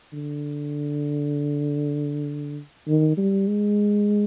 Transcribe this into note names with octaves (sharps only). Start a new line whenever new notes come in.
D3
D#3
G3
G#3